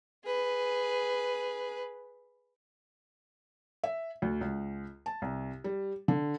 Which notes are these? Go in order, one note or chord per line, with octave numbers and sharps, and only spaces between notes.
G#4 B4
E5
D2
C#2
A5
C2
G3
D3